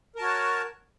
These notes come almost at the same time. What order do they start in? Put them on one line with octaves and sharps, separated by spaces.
A#4 A5 F#4 C#5